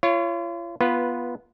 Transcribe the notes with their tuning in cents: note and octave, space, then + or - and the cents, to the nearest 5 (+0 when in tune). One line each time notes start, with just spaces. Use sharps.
F4 -40 C#5 +0
B3 -15 F4 -10 B4 +0